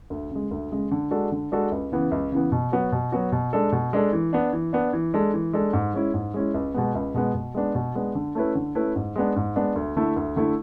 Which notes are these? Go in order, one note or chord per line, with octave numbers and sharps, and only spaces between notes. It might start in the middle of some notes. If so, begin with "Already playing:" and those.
D2
C#3 G#3
D2
C#3 G#3
D3
G#3 D4 F#4 A4
D3
G#3 D4 F#4 A4
C#2
C#3 E3 B3
C#2
C#3 E3 B3
B2
F#3 B3 F#4
B2
F#3 B3 F#4
B2
G#3 D4 A4
B2
G#3 D4 A4
E3
B3 D4
E3
B3 D4
E3
G#3 D4 A4
E3
G#3 D4 A4
G#2
G#3 C#4 E4
G#2
G#3 C#4 E4
C#2
B2 G#3 B3
C#2
B2 G#3 B3
B2
G#3 B3 D4
B2
G#3 B3 D4
D3
A3 C#4 E4 B4
D3
A3 C#4 E4 B4
G#2
G#3 B3 D4
G#2
G#3 B3 D4
D2
D3 A3 E4
D2
D3 A3 E4